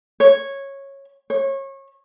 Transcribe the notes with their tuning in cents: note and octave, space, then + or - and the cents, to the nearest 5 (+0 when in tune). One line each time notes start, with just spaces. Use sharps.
C#5 -10
C#5 -30